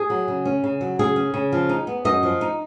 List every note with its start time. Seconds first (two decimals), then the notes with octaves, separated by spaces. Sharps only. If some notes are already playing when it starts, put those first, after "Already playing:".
Already playing: G#4
0.10 F#3
0.28 C#3
0.45 C#4
0.64 C#3
0.81 F#3
0.99 C#3 G#4
1.16 C#4
1.34 C#3
1.52 F3
1.69 D#4
1.87 B3
2.05 F#2 D#5
2.23 F3
2.41 D#4